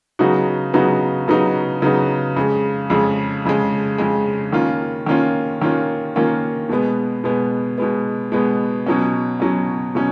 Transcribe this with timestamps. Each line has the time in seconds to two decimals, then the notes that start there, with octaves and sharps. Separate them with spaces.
0.19 C#3 F#3 B3 D#4 F#4
0.73 C#3 F#3 B3 D#4 F#4
1.28 C#3 F#3 B3 D#4 F#4
1.82 C#3 F#3 B3 D#4 F#4
2.36 F2 C#3 G#3
2.90 F2 C#3 G#3
3.45 F2 C#3 G#3
3.98 F2 C#3 G#3
4.52 D#3 A#3 C#4 F4
5.06 D#3 A#3 C#4 F4
5.62 D#3 A#3 C#4 F4
6.16 D#3 A#3 C#4 F4
6.69 B2 G#3 B3
7.24 B2 G#3 B3
7.78 B2 G#3 B3
8.32 B2 G#3 B3
8.86 B2 F#3 C#4
9.40 B2 F#3 C#4
9.95 B2 F#3 C#4